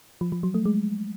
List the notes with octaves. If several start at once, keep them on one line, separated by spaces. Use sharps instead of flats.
F3
F3
F#3
A3
G#3